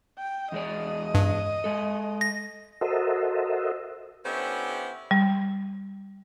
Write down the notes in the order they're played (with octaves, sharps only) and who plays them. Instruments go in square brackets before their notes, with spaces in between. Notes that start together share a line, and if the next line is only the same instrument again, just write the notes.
[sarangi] G5
[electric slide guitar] E2 G#3 D5 [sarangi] D#5
[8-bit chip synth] G2
[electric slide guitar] G#3 A4
[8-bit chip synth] A#6
[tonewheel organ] F#4 A4 A#4 C5 D#5 E5
[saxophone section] D3 B3 C#4 E4 G4 C5
[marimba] G3